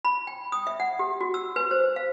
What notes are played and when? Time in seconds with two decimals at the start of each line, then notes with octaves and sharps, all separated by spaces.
0.05 B5
0.27 G5
0.52 D#6
0.67 E5
0.80 F#5
0.99 G4
1.21 F#4
1.34 E6
1.56 B4
1.71 C5
1.96 F5